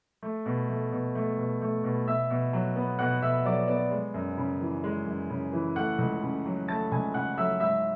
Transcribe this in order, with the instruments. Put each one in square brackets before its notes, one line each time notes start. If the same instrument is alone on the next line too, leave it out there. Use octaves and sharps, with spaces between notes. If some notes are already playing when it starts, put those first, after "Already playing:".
[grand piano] A3
B2
A3
B2
A3
B2
A3
B2
B2 E5 E6
B2
F#3
B3
B2 F#5 F#6
B2 E5 E6
F#3 D5 D6
B3 D5 D6
G#3
F#2
C#3
E3
G#3
F#2
C#3
E3
A3 F#5 F#6
C#2
C#3
F#3
A3 A5 A6
C#2 G#5 G#6
C#3 F#5 F#6
F#3 E5 E6
G#2 E5 E6